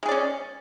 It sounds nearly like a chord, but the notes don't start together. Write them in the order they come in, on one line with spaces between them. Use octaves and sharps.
G#3 G#4 D5 C#4